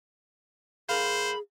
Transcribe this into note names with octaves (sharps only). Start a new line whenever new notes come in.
G#2 G#4 A#4 C5 F5 B5